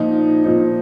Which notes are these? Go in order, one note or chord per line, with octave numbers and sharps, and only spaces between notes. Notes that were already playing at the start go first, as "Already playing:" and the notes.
Already playing: A#2 F3 D#4
A#2 F3 D#4